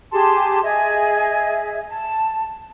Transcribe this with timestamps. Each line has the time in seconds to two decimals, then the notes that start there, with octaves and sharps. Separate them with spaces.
0.12 G4 G#4 A5 C6
0.62 G#4 D#5 E5
1.89 A5